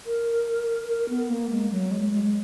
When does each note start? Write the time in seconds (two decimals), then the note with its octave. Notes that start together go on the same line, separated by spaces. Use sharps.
0.06 A#4
0.88 A#4
1.09 B3
1.30 A#3
1.50 G#3
1.71 F#3
1.91 G#3
2.12 G#3